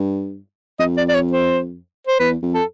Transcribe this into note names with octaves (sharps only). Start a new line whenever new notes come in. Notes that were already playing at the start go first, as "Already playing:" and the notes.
Already playing: G2
F2 D#5
D5
D5
C#5
C5
C5
E2 B4
F2
A4